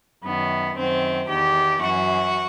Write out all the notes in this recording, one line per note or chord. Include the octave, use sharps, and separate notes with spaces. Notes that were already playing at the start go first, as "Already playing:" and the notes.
F#2 D#3 B3
F#2 D#3 C4
E2 D#3 G4
F#2 E3 F#4